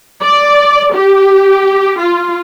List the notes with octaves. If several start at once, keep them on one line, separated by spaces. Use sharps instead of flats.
D5
G4
F4